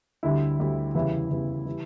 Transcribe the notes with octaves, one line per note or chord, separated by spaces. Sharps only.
D2 D3 G3 E4
D2 D3 G3
E2 C#3 E3 G3 E4
E2 C#3 E3 G3
E3 G3